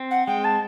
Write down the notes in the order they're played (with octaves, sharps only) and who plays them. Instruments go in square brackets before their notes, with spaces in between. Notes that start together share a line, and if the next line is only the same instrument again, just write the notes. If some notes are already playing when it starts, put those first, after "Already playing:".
Already playing: [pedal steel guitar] C4
[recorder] F#5
[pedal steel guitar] G#3 [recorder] G5
[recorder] A5